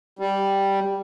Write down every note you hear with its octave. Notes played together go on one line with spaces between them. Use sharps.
G3